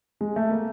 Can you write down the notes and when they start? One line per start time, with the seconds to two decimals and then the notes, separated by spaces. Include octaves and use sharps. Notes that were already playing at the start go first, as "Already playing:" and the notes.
0.21 G#3
0.36 A3
0.51 A#3